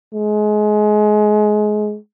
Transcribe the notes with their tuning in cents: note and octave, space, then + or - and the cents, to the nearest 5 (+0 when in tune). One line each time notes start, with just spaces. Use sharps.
G#3 +25